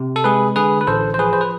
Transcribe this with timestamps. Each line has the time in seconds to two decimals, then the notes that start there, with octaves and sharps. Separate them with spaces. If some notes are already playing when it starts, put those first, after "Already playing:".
Already playing: C3
0.16 A4
0.24 G#3 G#4 B4
0.56 D3 G#4 B4
0.81 B4
0.87 A1 A4 C5
1.14 C5
1.18 F3 G#4 B4
1.33 C5
1.41 B4